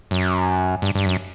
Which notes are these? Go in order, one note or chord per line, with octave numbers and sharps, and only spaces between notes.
F#2
G2
G2
F#2